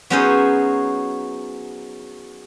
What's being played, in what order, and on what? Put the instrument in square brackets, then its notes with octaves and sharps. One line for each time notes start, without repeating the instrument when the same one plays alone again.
[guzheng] F#3 B3 C#4 D#4 G#4 C5